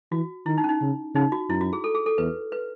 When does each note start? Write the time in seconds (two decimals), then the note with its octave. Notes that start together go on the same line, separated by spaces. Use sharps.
0.11 E3 F#4
0.46 D#3 E4
0.58 D#4
0.64 C#4
0.69 D#4
0.81 C#3
1.15 C#3 D#4
1.32 F#4
1.49 F#2 E4
1.61 F#4
1.73 G#4
1.84 A4
1.95 G#4
2.06 A4
2.18 E2 B4
2.52 B4